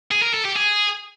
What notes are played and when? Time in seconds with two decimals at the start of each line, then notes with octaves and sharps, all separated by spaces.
0.11 G#4
0.22 A#4
0.33 A4
0.44 G4
0.56 G#4